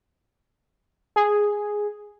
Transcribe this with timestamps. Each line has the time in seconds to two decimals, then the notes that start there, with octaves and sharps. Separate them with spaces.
1.16 G#4